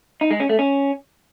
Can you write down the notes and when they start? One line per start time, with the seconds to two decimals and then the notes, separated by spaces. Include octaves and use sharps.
0.21 D#4
0.31 G#3
0.40 C#4
0.49 A3
0.59 C#4